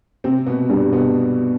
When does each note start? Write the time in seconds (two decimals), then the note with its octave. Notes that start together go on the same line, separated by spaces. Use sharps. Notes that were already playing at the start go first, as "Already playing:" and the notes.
0.24 C3 C4
0.46 B2 B3
0.69 G2 G3
0.93 B2 B3